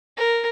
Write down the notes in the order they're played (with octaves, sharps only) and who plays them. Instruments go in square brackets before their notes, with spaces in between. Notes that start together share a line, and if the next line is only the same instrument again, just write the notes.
[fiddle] A#4